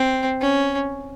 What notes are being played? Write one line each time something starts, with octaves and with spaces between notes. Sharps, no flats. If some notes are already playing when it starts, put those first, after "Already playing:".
Already playing: C4
C#4